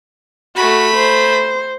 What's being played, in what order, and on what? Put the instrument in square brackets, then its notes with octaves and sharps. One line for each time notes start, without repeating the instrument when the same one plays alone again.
[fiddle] A3 B5 [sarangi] F#4
[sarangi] C5